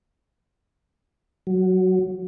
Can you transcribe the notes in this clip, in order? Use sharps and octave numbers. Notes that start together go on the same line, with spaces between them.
F#3